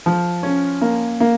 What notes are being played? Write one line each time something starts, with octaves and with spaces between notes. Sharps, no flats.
F3
C#4
A#3
A#3